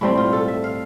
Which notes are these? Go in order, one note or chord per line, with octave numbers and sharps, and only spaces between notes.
A2 G3 C4 E4
F4
A4
E5
F5